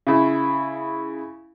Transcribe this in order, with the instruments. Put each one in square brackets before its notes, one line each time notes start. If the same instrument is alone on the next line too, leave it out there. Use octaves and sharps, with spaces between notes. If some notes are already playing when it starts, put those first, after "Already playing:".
[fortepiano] C#3 E4